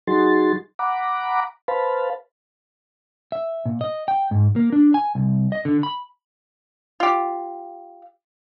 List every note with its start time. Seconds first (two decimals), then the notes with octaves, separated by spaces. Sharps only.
0.07 F#3 D#4 F#4 G#4 C6 A6
0.79 F#5 A#5 B5 D6
1.68 B4 C5 F5 A5 B5
3.32 E5
3.66 A#2
3.81 D#5
4.08 G5
4.31 G#2
4.56 A#3
4.72 D4
4.94 G#5
5.15 C2
5.52 D#5
5.65 D3
5.83 B5
7.00 F4 G4